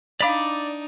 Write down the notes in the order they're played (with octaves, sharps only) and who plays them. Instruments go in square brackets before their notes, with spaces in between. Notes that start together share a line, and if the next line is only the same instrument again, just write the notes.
[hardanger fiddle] D4 D#4 [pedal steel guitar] D5 D6 [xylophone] F5 B5 B6